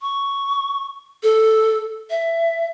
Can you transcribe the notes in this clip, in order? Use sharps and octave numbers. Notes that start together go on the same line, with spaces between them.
C#6
A4
E5